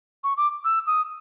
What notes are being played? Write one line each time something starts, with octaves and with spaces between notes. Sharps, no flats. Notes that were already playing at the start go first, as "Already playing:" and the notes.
C#6
D6
E6
D#6